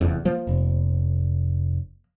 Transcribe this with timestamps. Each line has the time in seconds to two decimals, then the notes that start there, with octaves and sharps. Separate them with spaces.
0.01 F1 E2
0.25 F3 A#3
0.47 F1